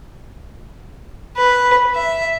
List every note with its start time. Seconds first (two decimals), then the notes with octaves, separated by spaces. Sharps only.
1.36 B4
1.95 E5